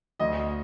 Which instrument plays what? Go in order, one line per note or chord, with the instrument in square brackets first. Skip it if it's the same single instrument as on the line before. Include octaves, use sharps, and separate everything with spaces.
[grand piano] D2 [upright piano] D#5